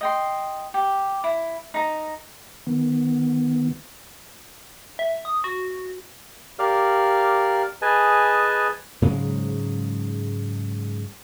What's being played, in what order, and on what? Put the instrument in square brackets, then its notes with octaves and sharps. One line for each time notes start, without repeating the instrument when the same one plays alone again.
[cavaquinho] D#5 G5 C6
G4
E4
D#4 A#5
[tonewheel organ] D#3 B3
[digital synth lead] E5
D#6
F#4
[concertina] G4 A#4 D5 F5 F6
G#4 B4 D#5 G#5 A5
[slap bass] G#2 C#3 F#3 G#3